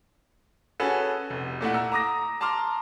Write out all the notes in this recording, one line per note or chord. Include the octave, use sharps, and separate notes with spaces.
C#4 F#4 G#4 A4 B4
F1
A#2 A3 E4 F#5
A#5 E6
A#5 D6 D#6 A#6
A5 A#5 C6 D6 F6